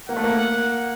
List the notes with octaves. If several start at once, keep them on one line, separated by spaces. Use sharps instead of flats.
A#3 F#5
A3
A#3